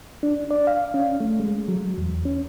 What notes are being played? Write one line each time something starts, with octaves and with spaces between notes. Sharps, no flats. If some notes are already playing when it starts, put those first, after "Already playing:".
D4
D5
F5
C#4
A3
G#3
F#3
E2
C#4